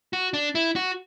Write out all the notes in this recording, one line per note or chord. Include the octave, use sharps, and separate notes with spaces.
F#4
D4
E4
F#4